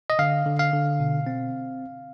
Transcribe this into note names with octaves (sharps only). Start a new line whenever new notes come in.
D#5
D3 F5
D3
F5
D3
B2
C4